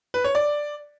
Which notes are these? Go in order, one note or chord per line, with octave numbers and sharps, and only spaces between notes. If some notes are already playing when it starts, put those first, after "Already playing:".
B4
C#5
D5